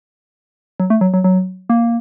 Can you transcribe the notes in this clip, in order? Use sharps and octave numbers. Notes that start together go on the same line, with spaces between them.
F#3
A3
F#3
F#3
F#3
A#3